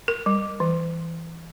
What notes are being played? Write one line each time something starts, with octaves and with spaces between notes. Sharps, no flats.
A#4
G3
E3